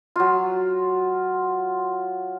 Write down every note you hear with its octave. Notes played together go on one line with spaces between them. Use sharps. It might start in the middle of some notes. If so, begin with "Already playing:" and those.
F#3 F4